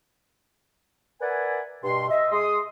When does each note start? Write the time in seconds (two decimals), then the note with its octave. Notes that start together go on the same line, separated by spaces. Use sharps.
1.21 A#4 B4 D5 E5 F#5 G#5
1.83 G2 B2 C6
2.09 D#5 E5
2.32 G#3 C6 D#6